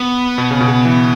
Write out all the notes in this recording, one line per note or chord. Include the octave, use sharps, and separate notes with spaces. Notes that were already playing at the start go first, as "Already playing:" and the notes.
Already playing: B3
B2
C#3
B2
C#3
E3